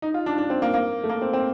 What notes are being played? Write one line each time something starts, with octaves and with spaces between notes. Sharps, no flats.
D#4
F4
D4
D4
C4
A#3
A#3
A3
A#3
C4
C4